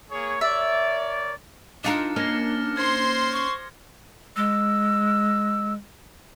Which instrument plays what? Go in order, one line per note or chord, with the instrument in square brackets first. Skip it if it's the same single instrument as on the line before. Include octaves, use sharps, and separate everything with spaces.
[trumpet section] A#3 G#4 C#5
[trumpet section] A#4 C#5 D5 [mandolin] E5
[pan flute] D4 [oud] D#4 F4 A#4 [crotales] D6 A6 C#7
[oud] A#3 C#4 D#4 [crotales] F6 A#6
[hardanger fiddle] C5 C6 [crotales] G#6
[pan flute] C#6
[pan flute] G#3 [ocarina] E6